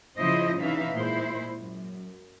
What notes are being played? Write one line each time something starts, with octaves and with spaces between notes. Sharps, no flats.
C#3 F3 E4 C5 D#5
C3 E3 C#4 D#4 E5 F5
A#2 G#3 E4 C5
F#2